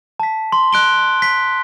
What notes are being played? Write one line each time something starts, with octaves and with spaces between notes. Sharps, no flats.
A5 B6
C6
F#6 D7 G7
B6